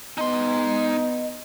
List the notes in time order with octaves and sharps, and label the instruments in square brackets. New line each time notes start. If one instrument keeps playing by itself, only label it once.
[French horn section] B3 [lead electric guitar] D#4 C6 [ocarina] D#5